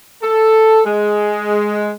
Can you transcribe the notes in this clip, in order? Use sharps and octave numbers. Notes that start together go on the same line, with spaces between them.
A4
G#3